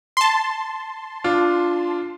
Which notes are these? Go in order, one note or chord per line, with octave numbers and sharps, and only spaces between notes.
A5 C6
D4 F4